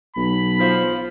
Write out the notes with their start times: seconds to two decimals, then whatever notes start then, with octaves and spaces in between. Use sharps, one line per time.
0.16 B1 B5
0.59 F4 C5 F5